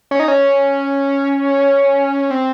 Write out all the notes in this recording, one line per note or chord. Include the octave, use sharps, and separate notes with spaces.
C#4
D#4
C#4
C4